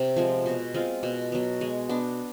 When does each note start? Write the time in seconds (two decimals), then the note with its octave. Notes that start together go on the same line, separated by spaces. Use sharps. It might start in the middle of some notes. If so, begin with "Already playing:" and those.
Already playing: C3
0.16 F3 G#3 C4
0.46 B2
0.74 G#3 C4 F4
1.03 B2
1.32 F#3 B3
1.61 G#3
1.89 B3 D4